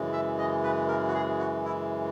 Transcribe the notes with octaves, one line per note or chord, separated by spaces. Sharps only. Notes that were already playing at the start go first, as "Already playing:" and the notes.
Already playing: F#2 C#3 E3 G#3
E5
D#5
B4
A#4
F#4
G#4
F#4
E4